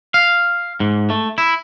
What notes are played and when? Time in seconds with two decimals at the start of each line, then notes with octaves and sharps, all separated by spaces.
0.14 F5
0.80 G#2
1.10 A3
1.38 E4